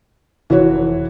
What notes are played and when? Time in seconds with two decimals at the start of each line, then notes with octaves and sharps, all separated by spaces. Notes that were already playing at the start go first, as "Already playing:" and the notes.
0.50 F1 E3 F#4 C#5